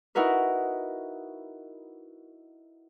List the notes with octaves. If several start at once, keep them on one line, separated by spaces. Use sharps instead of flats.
D#4 E4 F#4 A#4 B4